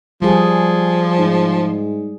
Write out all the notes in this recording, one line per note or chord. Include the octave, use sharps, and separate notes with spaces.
F3 G3 G#4
G#2